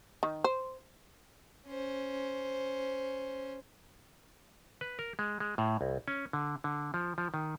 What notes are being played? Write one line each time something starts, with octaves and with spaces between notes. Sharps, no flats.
D#3
C5
C#4 C5
B4
A#4
G#3
G#3
A2
C2
C#4
D3
D3
F3
F3
D#3